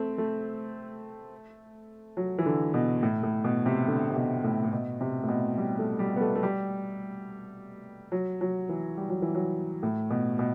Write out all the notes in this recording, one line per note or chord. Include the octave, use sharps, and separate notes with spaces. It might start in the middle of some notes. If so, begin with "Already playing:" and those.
Already playing: A3 C4
A3
F#3
E3
D3
B2
A2
A2
B2
C3
D3
C3
B2
A2
A2
B2
C3
A2
B2
G3
A3
G3
B3
A3
A3
G3
F#3
F#3
E3
G3
F#3
E3
F#3
A2
B2
B2